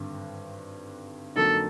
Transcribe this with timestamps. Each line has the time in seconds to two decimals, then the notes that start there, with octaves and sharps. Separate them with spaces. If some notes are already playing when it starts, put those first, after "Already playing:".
Already playing: G#1 G2 D3
1.36 F2 D3 F#3 A#3 D#4 A4